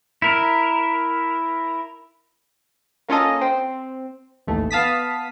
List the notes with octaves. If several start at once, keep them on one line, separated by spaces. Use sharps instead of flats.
E4 A#4
A#3 C#4 F4 A4 D#5
C4
A1 D#2 A3
B3 F5 A5 D#6 B6